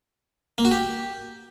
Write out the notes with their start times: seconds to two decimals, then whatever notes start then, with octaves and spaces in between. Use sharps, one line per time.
0.58 A#3
0.65 F#4
0.71 G4